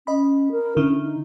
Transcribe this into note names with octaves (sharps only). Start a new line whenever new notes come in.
C#4 D#5 B5
A#4
D3 C#4 E4
D#4